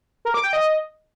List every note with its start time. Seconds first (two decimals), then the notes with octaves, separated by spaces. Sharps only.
0.25 A#4
0.34 D6
0.44 G5
0.53 D#5